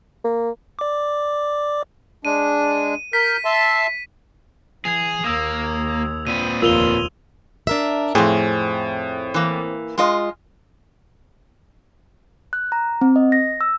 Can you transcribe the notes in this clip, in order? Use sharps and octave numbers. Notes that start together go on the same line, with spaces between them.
A#3
D5 D6
G#3 D4 D#7
A#4 G6 B6
E5 A5 C6
E3 G#4 G#6 F7
D#2 A#3 D#6 E6
A#2 C4 B4 D#7
F1 D#2 F4 A#4 E6 F7 G7
D4 A#4 E5
F2 A2 C4 G#4
E3 A#3
G#3 F4 D#5
F#6
A#5
C4
D#5
A#6
E6